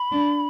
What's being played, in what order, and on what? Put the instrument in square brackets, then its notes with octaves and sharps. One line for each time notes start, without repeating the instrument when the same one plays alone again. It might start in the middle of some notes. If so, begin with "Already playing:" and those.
Already playing: [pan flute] B5
[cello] D4